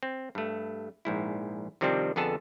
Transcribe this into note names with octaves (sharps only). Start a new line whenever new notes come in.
C4
G2 A3
A#1 G#2 E4
C3 D#3 F3 G3 C4 D4
F2 D3 B3 G#4 A4 A5